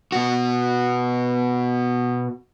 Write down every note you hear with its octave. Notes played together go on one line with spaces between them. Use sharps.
B2 F#4